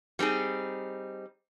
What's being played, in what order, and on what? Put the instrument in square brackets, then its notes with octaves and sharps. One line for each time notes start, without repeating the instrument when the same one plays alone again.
[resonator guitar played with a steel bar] G3 C4 D#4 G#4